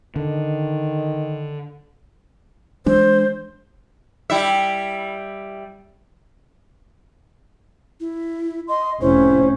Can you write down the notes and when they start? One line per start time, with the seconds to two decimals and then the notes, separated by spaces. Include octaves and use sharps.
0.16 D3 D#3
2.86 E3 G#3 D4 C5
4.30 G3 E4 E5
8.00 E4
8.69 D#5 C6
9.01 F1 C#4 E4 C5